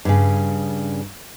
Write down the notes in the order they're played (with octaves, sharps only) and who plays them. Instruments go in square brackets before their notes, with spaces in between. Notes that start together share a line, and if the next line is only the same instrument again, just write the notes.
[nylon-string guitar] G2 C#3